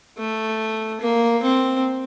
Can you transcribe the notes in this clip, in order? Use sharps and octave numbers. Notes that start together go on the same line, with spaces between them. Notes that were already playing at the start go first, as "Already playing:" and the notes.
A3
A#3
C4